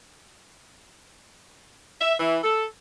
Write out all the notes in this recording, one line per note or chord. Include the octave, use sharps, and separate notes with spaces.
E5
E3
A4